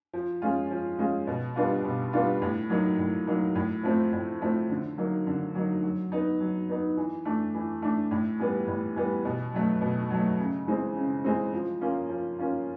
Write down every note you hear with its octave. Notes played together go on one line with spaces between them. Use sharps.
F3
G#3 C#4 F4
F3
G#3 C#4 F4
B2
G3 B3 D4 F4
B2
G3 B3 D4 F4
A2
F#3 A#3 D#4
A2
F#3 A#3 D#4
A2
F3 A3 C4
A2
F3 A3 C4
D3
F#3 A#3 D#4
D3
F#3 A#3 D#4
F#3
B3 D#4
F#3
B3 D#4
E3
A3 D4
E3
A3 D4
A2
E3 G3 B3
A2
E3 G3 B3
B2
F#3 A3
B2
F#3 A3
C#3
E3 G#3 C4
C#3
E3 G#3 C4
F3
A#3 C#4 F4
F3
A#3 C#4 F4